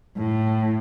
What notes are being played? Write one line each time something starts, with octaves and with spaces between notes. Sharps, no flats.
A2